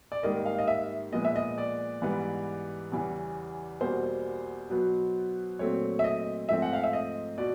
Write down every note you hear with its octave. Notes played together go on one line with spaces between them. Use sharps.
D5
G#2 D#3 G3 A#3 D#5
F5
D#5
E5
A#2 F3 G#3 B3 D#5
E5
D#5
D5
G#2 E3 G3 B3
E2 C#3 E3 G3
E2 B2 G3 A#3 C5
B2 F#3 B3
A#2 F#3 A3 C4 C#5
E5
D#5
G#2 F3 A3 C4 E5
F#5
F5
E5
D#5
B2 D5